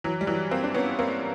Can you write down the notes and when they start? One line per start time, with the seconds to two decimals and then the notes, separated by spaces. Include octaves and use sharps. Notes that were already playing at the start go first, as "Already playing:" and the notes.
0.04 E3 F#3
0.21 G3
0.27 E3 F#3
0.51 A#3 C4
0.64 D4
0.74 B3 C#4
0.99 A#3 C4